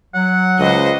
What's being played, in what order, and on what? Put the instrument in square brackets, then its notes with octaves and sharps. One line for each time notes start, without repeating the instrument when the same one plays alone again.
[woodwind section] F#3 [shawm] F#5
[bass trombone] C#2 [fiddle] C5 D#5